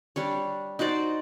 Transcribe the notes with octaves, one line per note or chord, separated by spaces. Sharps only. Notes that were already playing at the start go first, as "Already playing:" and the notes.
G3 D4 C#5
D#4 F#4 C5 D5